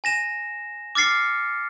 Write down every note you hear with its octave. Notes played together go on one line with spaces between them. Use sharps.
G#5 A#6 E7
D6 F6 A6 C7 C#7